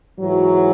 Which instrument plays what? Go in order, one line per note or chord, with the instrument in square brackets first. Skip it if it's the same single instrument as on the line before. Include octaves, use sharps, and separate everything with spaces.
[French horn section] G#2 E3 F#3